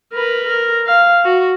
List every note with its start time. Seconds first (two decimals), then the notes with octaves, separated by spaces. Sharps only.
0.13 A#4 B4
0.46 A#4
0.87 F5
1.24 F#4